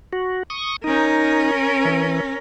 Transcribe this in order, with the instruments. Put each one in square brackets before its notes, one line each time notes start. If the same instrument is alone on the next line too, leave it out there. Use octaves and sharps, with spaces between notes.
[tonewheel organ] F#4
C#6 D#6
[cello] C#4 A#4 [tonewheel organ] D#4
[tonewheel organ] E3